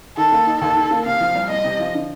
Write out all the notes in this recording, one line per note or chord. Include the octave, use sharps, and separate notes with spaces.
D#3 A4
A#3
D#4
D#2 A4
D#3
A#3
C3 F5
F3
C2
C2 D#5
C3
F3
D3